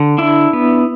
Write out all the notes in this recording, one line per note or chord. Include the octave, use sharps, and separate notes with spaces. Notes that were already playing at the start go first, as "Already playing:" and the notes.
Already playing: D3
D4 E4
B3